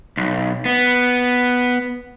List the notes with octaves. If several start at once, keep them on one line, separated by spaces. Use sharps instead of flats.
B1
B3